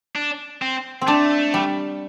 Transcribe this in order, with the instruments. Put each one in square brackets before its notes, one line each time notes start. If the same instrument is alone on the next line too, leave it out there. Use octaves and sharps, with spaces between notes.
[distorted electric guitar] D4
C4
[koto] C4
[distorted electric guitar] A3 [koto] D4
[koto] G3